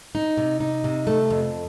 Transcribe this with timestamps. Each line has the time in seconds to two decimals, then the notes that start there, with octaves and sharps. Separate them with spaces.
0.15 D#4
0.37 C3
0.60 D#4
0.84 C3
1.07 A3
1.30 F2